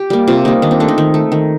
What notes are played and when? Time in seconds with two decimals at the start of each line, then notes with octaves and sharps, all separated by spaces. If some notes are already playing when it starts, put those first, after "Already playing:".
Already playing: G4
0.10 G3 A#3
0.27 C3 F4
0.45 G3 A#3 D#4
0.62 D#3 D4
0.71 C4
0.80 A3 D4
0.88 D#4
0.98 D#3
1.14 A3
1.32 D#3